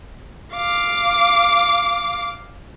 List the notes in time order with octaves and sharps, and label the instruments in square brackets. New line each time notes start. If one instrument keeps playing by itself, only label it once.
[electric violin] F5 D6